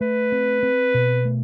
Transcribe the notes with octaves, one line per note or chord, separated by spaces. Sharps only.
A3 B4
C4
C4
B2
A3